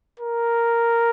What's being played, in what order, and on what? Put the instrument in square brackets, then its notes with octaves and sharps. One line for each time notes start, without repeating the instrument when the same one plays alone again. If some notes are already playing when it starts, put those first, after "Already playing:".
[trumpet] A#4